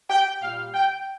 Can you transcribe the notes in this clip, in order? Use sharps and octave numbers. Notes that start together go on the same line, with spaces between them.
G5
A#2 G3 F5
G5